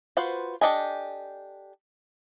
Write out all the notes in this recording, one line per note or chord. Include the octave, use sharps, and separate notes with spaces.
F4 F#4 B4 C5
D4 G4 A4 D#5 G#5